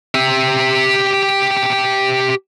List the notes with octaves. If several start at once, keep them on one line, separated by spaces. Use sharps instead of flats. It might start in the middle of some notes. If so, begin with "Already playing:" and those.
G4 E5